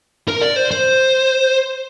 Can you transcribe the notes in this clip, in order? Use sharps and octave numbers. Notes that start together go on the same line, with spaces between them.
A#4
D5
C5
C5